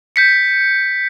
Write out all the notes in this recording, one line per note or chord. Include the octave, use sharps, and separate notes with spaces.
G6 B6 C#7